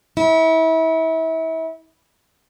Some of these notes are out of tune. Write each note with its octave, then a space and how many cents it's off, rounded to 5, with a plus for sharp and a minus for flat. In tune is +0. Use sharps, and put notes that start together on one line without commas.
E4 -30